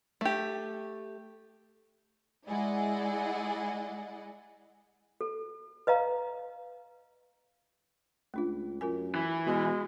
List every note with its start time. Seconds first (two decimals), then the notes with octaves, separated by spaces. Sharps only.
0.21 A3 G4
2.46 G#3 E4 G#4 D5 D#5 F#5
5.21 A4
5.87 B4 D#5 F5 A#5
8.34 C#2 A3 D4 F4
8.81 F#2 F4 A#4 G#5
9.15 E3
9.46 B2 G#3